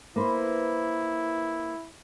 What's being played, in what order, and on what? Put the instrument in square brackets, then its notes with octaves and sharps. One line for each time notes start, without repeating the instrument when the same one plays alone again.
[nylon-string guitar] A#3 B4 C5 [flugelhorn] E4